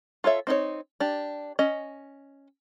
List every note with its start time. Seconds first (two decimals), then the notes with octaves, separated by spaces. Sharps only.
0.24 F4 A4 C#5 E5
0.47 C4 D#4 E4 C#5
1.00 D4 G4
1.59 C#4 D#5